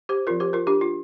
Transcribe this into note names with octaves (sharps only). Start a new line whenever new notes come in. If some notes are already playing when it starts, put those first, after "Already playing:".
G4 C5
F3 C4 F4 A#4
G4 C5
F4 A#4
D4 G4
F4